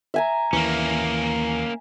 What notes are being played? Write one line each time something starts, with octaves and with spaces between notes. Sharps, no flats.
E5 G#5 A#5
D#2 E3 A#3 C#4